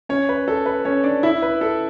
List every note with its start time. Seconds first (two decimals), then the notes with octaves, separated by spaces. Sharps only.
0.09 C#4 C#5
0.29 B4
0.48 A4
0.66 B4
0.85 C#4 C#5
1.04 D4 D5
1.23 E4 E5
1.42 B4
1.61 A4